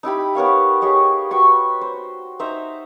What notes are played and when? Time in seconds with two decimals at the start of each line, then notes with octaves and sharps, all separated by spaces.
0.03 D#4 E4 G4 B5
0.35 B3 A#4 C#5 F5
0.82 G4 G#4 C#5 D#5
1.31 F#4 B4 G5 C#6
1.81 C5
2.39 D#4 C5 E5 A#5